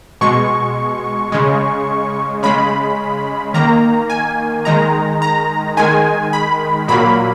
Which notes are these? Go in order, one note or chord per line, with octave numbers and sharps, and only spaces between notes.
B2 G#3 C#6
C#3 G#3
C#3 G#3 B5
D#3 A#3 A#5
G#5
D#3 G#3 A#5
A#5
D#3 G#3 G#5
B5
A#2 F#3 A#3 B5